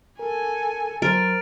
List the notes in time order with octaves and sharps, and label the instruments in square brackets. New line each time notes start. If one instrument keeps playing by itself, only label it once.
[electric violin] A4 G#5 [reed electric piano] A#4
[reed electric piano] F#3 C5 [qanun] A#4 [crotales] A6 D7 F7